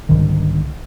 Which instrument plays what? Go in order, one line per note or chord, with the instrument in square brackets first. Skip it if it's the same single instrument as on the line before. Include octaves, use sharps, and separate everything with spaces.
[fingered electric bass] C2 G#2 D3 D#3